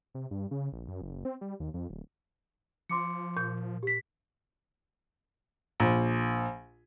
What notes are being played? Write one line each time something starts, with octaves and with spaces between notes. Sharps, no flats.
C3
G2
C#3
A#1
F#2
F#1
C4
G3
D#2
F2
D1
F3 C6 D6 C#7
A#2 G6
G4 B6
A#1